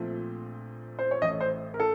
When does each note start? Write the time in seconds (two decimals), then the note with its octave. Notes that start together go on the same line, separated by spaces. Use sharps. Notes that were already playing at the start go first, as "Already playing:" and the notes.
Already playing: A#1 A#2 F3 A3 C4
0.99 C5
1.11 C#5
1.22 A1 A2 A3 D#5
1.40 C5
1.74 A#4
1.80 A4